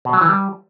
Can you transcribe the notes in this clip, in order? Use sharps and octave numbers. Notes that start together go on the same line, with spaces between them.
B2
F#3
E3
G3